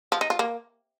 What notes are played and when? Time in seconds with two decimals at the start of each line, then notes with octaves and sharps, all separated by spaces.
0.12 F3
0.21 D#4
0.30 F4
0.39 A#3